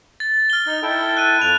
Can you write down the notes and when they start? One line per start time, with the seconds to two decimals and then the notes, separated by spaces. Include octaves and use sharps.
0.20 A6
0.50 F6 G7
0.66 D#4 G7
0.83 E4 A4 G5
1.17 F#6 D#7
1.41 F2 F#6 F7